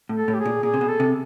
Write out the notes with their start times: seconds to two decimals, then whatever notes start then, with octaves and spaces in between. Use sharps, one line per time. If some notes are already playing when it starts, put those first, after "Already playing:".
0.09 A2
0.15 A4
0.28 A2
0.34 G4
0.40 G#4
0.45 A#2
0.63 A#2 G#4
0.74 C3
0.81 B2
0.88 A4
1.00 C3